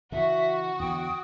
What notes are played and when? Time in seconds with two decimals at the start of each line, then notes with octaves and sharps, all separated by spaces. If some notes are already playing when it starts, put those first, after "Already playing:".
0.12 C#3 E3 F#4 E5
0.80 E2 D3 G5 D#6